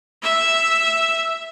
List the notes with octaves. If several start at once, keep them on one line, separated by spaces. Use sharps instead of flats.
E5